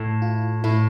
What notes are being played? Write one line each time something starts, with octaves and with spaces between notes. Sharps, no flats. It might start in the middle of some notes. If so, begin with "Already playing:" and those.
Already playing: A2 E4
F4
A2 E4